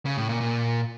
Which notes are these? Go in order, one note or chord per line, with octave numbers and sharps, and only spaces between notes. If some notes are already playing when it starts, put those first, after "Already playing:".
C#3
A2
A#2
A#2